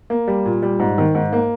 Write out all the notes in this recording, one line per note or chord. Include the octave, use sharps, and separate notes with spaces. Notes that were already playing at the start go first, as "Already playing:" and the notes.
A#3
G3
A#2
G3
G#2
D#3
G#2
A#3